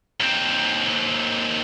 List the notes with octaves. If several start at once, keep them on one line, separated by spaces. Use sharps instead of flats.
D#2 C4